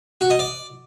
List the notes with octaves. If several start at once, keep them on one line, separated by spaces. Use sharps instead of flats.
F#4
D#5
D5